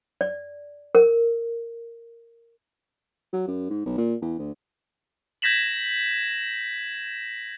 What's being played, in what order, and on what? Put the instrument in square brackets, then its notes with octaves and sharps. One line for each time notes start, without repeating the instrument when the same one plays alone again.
[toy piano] D5
A#4
[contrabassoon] F#3
F#2
G#2
B1
A#2
E2
D2
[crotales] G6 G#6 A#6 B6 E7 F#7